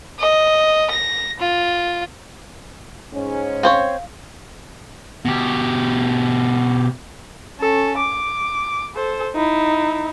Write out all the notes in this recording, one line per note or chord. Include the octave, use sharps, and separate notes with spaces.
D#5
A#6
F4
G#2 C#4
C4 C5 C#5 F5
B2 G4
C#4 A4
D6
A4 C5
D#4 E4